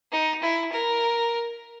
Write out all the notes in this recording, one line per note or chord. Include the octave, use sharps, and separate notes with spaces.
D#4
E4
A#4